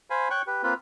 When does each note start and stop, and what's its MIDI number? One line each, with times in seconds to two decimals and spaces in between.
0.10 0.28 72
0.10 0.28 77
0.10 0.28 80
0.10 0.28 83
0.30 0.42 73
0.30 0.42 79
0.30 0.42 85
0.30 0.42 90
0.47 0.62 67
0.47 0.62 71
0.63 0.74 58
0.63 0.74 60
0.63 0.74 65
0.63 0.74 71